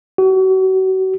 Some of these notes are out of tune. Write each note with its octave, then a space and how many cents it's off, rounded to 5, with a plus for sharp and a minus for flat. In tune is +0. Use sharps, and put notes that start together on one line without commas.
F#4 +35